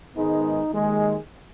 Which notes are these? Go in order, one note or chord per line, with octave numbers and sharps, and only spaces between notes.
G#2 D#3 G#3 B3 D#4
D#2 D#3 G#3